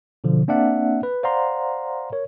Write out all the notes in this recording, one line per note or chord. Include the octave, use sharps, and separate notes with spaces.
B2 D3 F3
A#3 C4 D4 D5 E5 F#5
B4
C5 D5 F5 F#5 A#5 C6
A#4 C#5